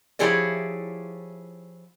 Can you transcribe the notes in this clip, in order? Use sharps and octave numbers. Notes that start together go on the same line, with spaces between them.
F3 E4 G4 G#4 C#5 D5